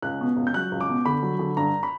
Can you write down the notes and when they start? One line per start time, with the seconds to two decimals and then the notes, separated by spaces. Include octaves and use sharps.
0.02 C#2 F#6
0.21 B2
0.37 C#2
0.47 G6
0.54 F#3 F#6
0.72 C#2
0.81 D6
0.89 B2
1.05 D3 B5
1.23 F#3
1.39 D3
1.57 G2 A#5
1.83 B5